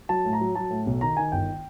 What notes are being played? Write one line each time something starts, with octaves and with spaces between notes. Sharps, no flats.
F#3 A5
A2
A#5
F#3
F#3 A5
A2
B1
D#3 A#5
D#3 G#5
G1 G5